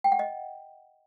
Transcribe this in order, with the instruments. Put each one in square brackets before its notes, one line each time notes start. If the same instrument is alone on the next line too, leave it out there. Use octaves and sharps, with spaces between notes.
[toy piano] G5
F#5
D#5